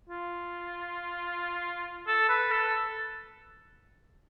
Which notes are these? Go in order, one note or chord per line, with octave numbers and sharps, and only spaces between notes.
F4
A4
B4
A4